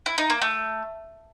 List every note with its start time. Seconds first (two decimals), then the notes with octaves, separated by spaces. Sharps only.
0.06 E4
0.18 D#4
0.30 A#3
0.42 A3